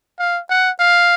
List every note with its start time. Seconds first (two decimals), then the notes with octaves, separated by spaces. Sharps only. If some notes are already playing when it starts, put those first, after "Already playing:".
0.19 F5
0.49 F#5
0.80 F5